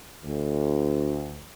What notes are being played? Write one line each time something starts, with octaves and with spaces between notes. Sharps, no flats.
D2